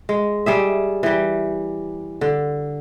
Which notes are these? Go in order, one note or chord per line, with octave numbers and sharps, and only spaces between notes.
G#3
G3 G#4 E5
E3 G3
D3